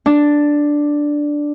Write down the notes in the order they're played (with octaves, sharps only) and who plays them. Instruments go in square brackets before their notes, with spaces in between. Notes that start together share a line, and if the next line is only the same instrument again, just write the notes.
[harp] D4